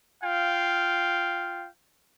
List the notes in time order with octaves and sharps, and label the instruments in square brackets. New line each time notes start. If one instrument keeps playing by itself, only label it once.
[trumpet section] F4 F5 G5